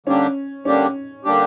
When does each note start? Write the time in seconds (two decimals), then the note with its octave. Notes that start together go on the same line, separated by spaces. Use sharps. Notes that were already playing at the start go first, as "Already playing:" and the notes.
0.06 D3 G3 A#3 C#4 D4 G4
0.65 D3 G3 A#3 C#4 D4 G4
1.25 D3 G3 A#3 D4 G4